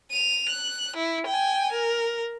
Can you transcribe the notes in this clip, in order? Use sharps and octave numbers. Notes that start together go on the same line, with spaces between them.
D#7 F7
F#6
E4
G5 G#5
A#4